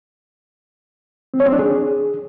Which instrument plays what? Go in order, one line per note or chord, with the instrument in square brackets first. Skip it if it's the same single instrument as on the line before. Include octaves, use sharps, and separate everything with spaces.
[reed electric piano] C4
C#5
C4
D4
G#4